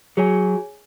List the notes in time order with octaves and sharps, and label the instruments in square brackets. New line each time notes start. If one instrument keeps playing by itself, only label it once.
[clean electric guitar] F#3 [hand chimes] G#4 C#5 G#5